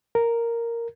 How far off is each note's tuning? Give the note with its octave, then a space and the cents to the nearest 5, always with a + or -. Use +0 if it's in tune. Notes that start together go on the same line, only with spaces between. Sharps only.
A#4 -5